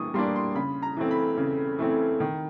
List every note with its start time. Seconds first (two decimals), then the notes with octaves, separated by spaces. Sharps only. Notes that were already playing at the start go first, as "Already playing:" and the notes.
Already playing: E3 G3 A#3 D4 C#6 D#6
0.14 G3 A#3 D4 C6
0.36 C6
0.55 C#3 B5
0.82 A#5
0.97 E3 A3 C4
1.11 B5
1.37 C#3
1.79 E3 A3 C4
2.20 D#3